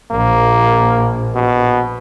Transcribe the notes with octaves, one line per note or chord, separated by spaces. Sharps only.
A#1 A#3
B2